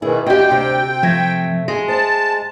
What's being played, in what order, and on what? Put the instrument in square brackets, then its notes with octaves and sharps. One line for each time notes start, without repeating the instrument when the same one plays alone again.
[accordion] B2 D#3 E3 [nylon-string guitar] E4 G#4
[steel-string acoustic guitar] D2 G4 [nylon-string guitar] D#5 [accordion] G5
[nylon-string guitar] C3 C4
[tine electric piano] F3 G#6 A#6 [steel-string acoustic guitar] A3
[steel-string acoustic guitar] G#3 [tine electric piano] A#6
[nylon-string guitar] C5 [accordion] A5